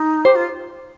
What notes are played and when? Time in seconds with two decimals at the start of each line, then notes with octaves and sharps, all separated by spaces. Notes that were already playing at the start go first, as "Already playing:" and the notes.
Already playing: D#4
0.25 G4 C5
0.35 F4